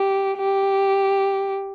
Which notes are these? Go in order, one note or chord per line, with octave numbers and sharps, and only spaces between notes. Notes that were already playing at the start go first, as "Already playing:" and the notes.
Already playing: G4
G4